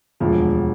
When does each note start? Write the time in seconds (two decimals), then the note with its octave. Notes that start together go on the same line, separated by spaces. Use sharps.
0.20 E1 D2 D3 F3